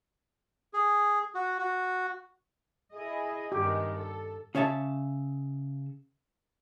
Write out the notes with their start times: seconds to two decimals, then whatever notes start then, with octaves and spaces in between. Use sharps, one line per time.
0.73 G#4
1.35 F#4
1.59 F#4
2.93 E4 G#4 D#5
3.52 G2 D#3 G#3 G4
3.95 A4
4.55 C#3 C#5 E5 A5